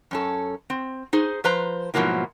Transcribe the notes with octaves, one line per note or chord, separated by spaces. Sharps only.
F#2 C#4 A4
C4
D#4 G#4 C5
F3 B4 C5 A#5
G#2 B2 F3 F#3 A#3 E4